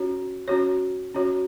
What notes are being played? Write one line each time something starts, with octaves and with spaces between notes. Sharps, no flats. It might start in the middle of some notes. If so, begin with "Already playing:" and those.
Already playing: C#4 F#4 C#5
C#4 F#4 C#5
C#4 F#4 C#5